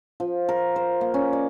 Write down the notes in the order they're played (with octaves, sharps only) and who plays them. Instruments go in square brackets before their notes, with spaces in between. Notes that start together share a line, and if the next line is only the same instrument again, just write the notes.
[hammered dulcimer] F3
A#4
C5
A#3
C#4
D5